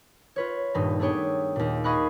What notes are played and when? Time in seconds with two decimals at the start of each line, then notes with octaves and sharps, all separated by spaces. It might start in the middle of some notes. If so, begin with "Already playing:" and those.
0.36 F4 B4 C#5
0.74 D#1 G2 D#4
0.99 A3 B3 D4 G#4 C#5 G5
1.56 D#2 A#2
1.84 G#4 D#5 F5 B5 C#6 F#6